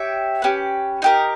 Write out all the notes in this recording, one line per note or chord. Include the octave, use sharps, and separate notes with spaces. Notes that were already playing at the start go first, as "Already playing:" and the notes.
Already playing: G4 C#5 E5 G5
C#4 G4 B4
D#4 G4 A#4